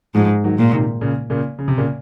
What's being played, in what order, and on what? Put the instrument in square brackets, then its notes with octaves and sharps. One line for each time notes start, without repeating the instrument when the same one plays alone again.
[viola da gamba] G#2 [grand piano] F3 G#3
[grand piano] D#3 F#3
[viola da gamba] A#2
[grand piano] C3 D#3
A#2 C#3
A#2 C#3
C#3
C3
A#2 C#3